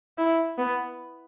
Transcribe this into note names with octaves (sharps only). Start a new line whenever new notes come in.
E4
B3